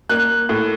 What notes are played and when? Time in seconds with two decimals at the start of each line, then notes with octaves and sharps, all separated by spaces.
0.09 A#3 F#6
0.49 A2